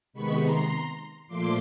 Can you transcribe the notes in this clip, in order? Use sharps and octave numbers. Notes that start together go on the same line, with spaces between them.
C3 D#3 G#3 B3 B5 C#6
A#5 C6
A#2 F3 A3 C6 D6